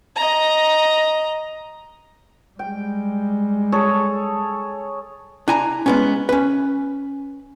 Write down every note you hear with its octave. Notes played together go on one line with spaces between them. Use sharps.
D#5 A#5
G3 G#3 G5
G#4 A4 C#5
D4 E4 G#5 A#5
G#3 B3 C#4
C#4 B4